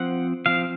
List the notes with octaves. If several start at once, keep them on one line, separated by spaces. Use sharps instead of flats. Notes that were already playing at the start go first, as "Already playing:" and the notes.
Already playing: F3 C4 F#5
F3 C4 F5